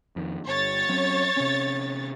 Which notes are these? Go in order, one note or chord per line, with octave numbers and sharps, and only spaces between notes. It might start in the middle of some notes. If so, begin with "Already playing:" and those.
F2 D#3
G1 C#5 A6
F#3 C4 C#4
C3 C#4